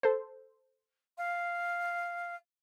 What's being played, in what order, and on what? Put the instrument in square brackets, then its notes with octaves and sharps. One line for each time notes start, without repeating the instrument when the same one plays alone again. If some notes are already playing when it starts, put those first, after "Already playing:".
[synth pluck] A4 C5
[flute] F5